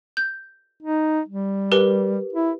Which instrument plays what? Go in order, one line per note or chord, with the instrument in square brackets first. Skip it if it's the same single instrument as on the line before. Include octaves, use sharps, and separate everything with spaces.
[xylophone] G6
[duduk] D#4
G3
[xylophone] G4 A#4 B4
[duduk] E4